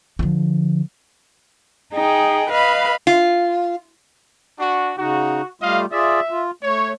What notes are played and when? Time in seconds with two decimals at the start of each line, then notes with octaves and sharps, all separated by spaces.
0.19 D3 F3
1.93 D#4 G#4 G5
2.50 B4 D#5 F5 B5
3.07 F4
4.59 D4 F#4
4.98 C#3 D#4 F#4
5.61 G3 A3 F4 D#5 F5
5.92 F4 G#4 D5 E5
6.31 F4
6.63 A3 C#5